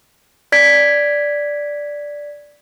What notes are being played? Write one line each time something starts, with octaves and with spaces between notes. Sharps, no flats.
D5 G#6 B6 D7